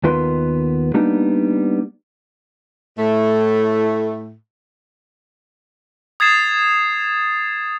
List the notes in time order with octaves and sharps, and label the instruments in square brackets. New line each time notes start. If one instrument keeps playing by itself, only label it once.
[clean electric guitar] D#2 B3 F4 A#4 B4 C6
G3 A#3 B3 D4 D#4
[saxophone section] A2 A3
[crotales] D#6 G#6 A6 C7 E7